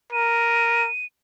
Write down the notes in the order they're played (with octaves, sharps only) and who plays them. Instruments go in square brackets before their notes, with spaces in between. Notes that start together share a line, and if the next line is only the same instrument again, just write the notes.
[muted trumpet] A#4 [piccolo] D#7